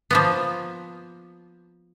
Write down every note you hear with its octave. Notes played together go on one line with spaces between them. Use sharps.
F3 A#3 B3